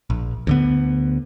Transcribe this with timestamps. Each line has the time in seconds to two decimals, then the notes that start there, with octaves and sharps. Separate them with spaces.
0.10 A#1
0.47 D2 D3 B3